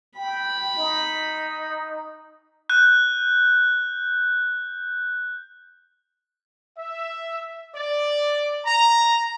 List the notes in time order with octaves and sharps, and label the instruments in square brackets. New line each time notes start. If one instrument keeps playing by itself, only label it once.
[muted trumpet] G5 [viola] B5
[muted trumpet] D#4
[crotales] F#6 G6
[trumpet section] E5
D5
A#5